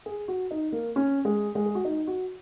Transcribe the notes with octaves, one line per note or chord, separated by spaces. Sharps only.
G#4
F#4
D#4
A#3
C#4
G#3
G#3
G#4
F#4
D#4
F#4